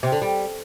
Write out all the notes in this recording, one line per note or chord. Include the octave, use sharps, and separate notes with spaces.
C3
D3
G3